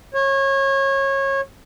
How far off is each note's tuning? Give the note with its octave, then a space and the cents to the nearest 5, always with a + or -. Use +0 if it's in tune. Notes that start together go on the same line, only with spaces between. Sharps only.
C#5 -25